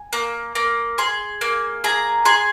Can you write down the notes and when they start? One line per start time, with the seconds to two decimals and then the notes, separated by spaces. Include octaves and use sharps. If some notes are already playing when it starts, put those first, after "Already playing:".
Already playing: G#5
0.13 A#3
0.55 A#3
0.98 G#4 C6
1.41 A#3
1.84 G#4 A#5
2.25 G#4 C6